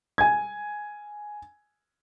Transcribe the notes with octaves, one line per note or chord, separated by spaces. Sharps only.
G#5 G#6